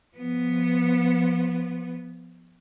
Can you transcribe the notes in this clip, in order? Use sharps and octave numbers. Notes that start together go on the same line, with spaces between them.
F3 B3